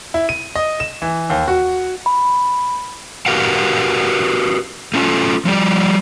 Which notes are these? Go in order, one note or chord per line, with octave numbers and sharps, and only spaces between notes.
E4
D#7
D#5
E7
E3
D#2
F#4
B5
F#4 G4 A#4 B4 F5 F#5
A3 C#4 F4 A4
F3 G3 D5